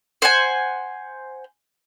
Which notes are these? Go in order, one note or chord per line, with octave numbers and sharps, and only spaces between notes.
C5 F#5 G#5